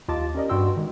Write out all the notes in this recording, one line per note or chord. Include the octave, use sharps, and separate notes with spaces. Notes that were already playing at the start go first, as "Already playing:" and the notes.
D#2 F4 D#5 A5 D6 A6
C#4 G4 A#4 D5 D#5
G2 B3 F#4 G5 C6 E6
D#3 G#3